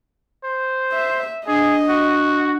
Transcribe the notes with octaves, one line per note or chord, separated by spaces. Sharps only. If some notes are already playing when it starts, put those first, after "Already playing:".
C5
E5
D4 G#4 D#5
F#4